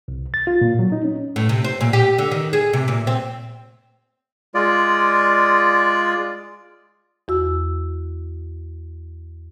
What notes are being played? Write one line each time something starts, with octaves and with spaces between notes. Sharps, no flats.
C2
A6
F4
A#2
F#3
D#4
C#4
A2
C3
C5
A#2
G4
D3
D#3
G#4
C3
A#2
C4
G#3 F4 D5
E2 F#4 E6